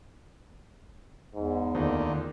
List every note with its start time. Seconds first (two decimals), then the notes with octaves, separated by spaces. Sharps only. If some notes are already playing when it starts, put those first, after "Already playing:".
1.35 E2 G#2
1.75 D2 A#2 D#3